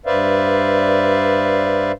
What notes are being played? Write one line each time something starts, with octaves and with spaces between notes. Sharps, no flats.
G2 B4 C5 D5 E5 F5